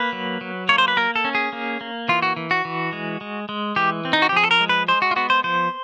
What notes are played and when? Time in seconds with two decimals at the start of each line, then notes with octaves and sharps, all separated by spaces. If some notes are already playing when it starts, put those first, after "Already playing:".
Already playing: A#3 B4
0.13 F#3
0.41 F#3
0.69 A#3 C#5
0.78 C5
0.88 B4
0.97 A#3 A#4
1.16 A4
1.25 C#4
1.35 G#4
1.53 A#3
1.81 A#3
2.08 E3 F4
2.22 F#4
2.37 E3
2.51 F#4
2.65 E3
2.93 G#3
3.21 G#3
3.49 G#3
3.76 E3 G4
4.05 C4
4.13 D#4
4.22 F#4
4.29 G4
4.32 F3 G#4
4.44 A4
4.51 A#4
4.60 G#3
4.69 B4
4.88 G#3 C5
5.02 F#4
5.11 F4
5.16 B3 F#4
5.30 C5
5.44 F3 C5